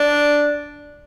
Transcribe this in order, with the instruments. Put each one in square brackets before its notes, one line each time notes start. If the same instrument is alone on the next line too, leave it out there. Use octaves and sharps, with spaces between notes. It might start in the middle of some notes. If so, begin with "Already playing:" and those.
Already playing: [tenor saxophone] D4